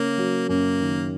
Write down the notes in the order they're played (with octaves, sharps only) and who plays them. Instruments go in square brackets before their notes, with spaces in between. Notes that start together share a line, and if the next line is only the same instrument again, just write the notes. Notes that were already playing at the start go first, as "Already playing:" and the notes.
Already playing: [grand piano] C#3 C#4 [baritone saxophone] A#3
[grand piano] F#3
[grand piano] F#2 [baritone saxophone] A#3
[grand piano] D#3